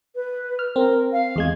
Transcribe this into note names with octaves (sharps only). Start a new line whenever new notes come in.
B4
F6
C4 A#4
F5
E2 G#3 G#6